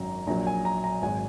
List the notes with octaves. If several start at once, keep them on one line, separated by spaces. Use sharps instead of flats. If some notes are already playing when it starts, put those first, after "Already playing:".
Already playing: G#1 F#2 F#3 A#5
A#1 A#2 F#3 A#5
G#5
A#5
A#5
G#1 G#2 F#3 G#5